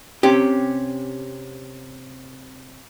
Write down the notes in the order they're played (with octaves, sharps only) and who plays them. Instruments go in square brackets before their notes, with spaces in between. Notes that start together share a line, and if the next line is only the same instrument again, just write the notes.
[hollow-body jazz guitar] C3 C#4 G4